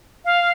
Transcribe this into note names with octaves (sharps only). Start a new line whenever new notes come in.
F5